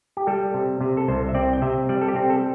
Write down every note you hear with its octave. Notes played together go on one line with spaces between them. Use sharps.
G4
G3 A4
C3
C3
A4
C2 C5
E5
C4 D5
G5
C3 E5
G3 D5
A4
G4
C4
A4